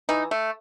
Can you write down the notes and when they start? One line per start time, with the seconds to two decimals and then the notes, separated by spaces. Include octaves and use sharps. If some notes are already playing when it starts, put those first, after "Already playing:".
0.09 E3 D#4
0.31 A3